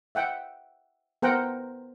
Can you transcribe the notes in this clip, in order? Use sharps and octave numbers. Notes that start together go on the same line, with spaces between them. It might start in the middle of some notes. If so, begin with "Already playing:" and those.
E5 F#5 G5
B3 A#4 C5 F#5 G5 A#5